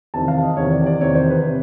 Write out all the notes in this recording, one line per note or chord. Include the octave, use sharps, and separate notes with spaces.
E2 C3 D#3 A5
F5
D#5
E2 C3 D#3 C#5
D5
D5
E2 C3 D#3 C#5
C5
B4
C3